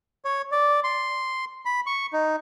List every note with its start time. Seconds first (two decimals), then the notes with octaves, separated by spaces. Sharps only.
0.25 C#5
0.52 D5
0.84 C6
1.65 B5
1.86 C#6
2.13 D#4